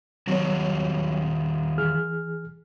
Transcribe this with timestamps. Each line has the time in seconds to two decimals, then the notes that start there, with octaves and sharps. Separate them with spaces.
0.28 D#3 F#3 G3 B3 F#4 C#5
1.78 E3 G#4 F6